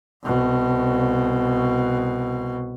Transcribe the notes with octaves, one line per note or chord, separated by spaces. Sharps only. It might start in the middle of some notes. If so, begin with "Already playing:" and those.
C2 B2